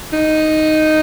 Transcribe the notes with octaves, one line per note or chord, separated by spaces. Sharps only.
D#4